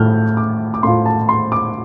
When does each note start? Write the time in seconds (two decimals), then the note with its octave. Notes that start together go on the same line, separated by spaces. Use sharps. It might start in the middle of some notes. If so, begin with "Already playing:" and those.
Already playing: A2 A3 F4 F6 G6
0.37 D6
0.74 D6
0.83 A2 A3 F4 C6
1.06 A5
1.29 C6
1.52 D6